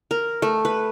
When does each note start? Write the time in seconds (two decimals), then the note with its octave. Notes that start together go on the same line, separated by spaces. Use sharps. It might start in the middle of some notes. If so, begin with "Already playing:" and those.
0.11 A#4
0.42 A3
0.65 B4